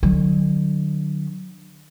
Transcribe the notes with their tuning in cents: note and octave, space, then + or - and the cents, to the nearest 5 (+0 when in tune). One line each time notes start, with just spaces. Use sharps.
D3 +40 F#3 +0